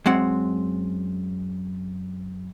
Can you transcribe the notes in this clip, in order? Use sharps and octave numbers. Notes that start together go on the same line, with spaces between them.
F#2 G#3 C4 F#5